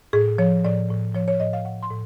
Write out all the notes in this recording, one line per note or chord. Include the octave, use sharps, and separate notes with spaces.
A2 G#4
F3 C#5
A2 D5
A2
F3 C#5
C#5
A2 D#5
F5
A2 F#5
C6
A2